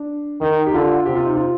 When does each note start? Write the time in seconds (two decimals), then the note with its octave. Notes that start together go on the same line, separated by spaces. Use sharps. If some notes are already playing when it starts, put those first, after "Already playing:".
Already playing: D4
0.41 D#3 D#4
0.67 G4
0.74 D3 F4
1.06 C3 G4
1.15 F4
1.25 D#4
1.35 F4